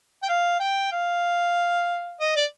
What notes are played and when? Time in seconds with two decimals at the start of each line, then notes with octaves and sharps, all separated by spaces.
0.23 G5
0.29 F5
0.60 G5
0.92 F5
2.21 D#5
2.36 D5